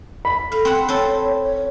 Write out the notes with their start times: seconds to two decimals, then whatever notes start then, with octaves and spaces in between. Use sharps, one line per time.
0.25 B5
0.52 A4 F5
0.65 C4 F#5
0.88 C4 A4 C#5
1.41 C#5